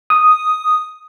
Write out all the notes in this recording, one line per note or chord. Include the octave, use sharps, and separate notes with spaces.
D#6